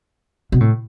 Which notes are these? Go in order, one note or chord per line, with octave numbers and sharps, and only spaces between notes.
B2
A2